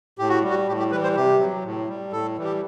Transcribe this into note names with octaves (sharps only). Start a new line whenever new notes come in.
A2 G4
F#4
G3
F#4
A2 G4
G4
E3 G3 B4
C5
C3 G4
F#3
A2
G3
A2 A4
E3 G3
G4